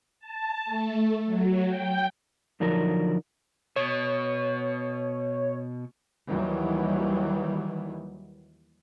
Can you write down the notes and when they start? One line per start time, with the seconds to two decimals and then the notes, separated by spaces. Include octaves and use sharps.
0.20 A5
0.65 A3
1.26 F#3
1.69 G5
2.60 D3 F3 F#3 D4 D#4 A#4
3.76 B2 C#5
6.29 D#2 D#3 E3 F#3 G3